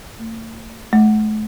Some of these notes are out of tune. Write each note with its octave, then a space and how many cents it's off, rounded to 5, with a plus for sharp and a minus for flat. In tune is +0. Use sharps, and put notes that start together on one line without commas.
A3 +45
A3 -40